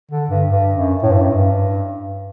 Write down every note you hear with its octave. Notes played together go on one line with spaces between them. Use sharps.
D3
G2
G2
F#2
A2
G2
F#2
G2